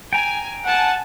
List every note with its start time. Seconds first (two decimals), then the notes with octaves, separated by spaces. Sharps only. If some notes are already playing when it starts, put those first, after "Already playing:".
0.13 G5 G#5 A#5
0.66 F#5 G#5 A5